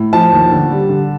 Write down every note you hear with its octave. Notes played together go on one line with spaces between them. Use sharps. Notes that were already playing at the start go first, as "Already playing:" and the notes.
Already playing: A2
F3 A5
D#2
D3
G3
D3